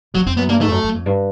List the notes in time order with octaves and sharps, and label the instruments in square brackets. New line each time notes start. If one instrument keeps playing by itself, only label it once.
[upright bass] F2 [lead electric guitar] F#3
[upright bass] F2 [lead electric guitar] C4
[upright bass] F#2 [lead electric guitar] B3
[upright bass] G2 [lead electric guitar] A#3
[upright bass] G#2 [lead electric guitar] A3
[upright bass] F2
F#2
F#2
F2
G2